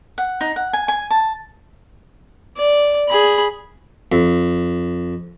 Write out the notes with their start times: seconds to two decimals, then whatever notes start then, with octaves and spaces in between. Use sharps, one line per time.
0.18 F#5
0.41 D#4
0.56 F#5
0.73 G#5
0.88 G#5
1.10 A5
2.57 D5
3.08 G#4 B5
4.12 F2